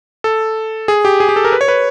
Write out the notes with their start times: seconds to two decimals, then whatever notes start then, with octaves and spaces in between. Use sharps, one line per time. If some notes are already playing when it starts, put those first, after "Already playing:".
0.24 A4
0.88 G#4
1.05 G4
1.20 G#4
1.29 G4
1.36 A4
1.45 A#4
1.52 B4
1.61 C#5
1.68 B4